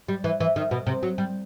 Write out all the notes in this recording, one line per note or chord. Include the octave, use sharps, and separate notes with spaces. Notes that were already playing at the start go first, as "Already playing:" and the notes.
G3
E3
E3
D#3
B2
C3
F#3
G3